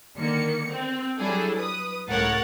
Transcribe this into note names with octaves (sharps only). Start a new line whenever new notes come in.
D3 D#3 A#3 C#7
C4
F#3 G3 D4 E4 G#4 A4
B4 D#6
C#2 A2 A#4 C#5 F#5 A6